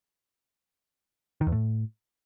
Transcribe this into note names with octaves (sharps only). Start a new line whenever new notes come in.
D#3
E2
A2